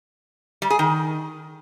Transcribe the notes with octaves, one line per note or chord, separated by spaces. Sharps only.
G3
G#4
D#3